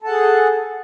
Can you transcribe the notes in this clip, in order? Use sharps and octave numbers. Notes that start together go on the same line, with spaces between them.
G#4 A4 F#5 A5